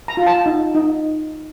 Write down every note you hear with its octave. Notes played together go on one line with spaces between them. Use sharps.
A#5
F4
A5
D#4
D#4